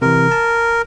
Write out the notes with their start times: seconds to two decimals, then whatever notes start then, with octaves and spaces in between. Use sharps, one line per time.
0.02 C3 E3 A#4
0.31 A5